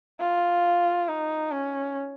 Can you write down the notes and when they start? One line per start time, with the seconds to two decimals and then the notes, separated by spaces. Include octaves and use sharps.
0.20 F4
1.08 D#4
1.51 C#4